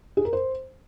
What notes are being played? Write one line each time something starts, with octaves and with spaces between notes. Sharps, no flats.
G#4
A#4
C5